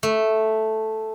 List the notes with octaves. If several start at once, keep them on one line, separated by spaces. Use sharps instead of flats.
A3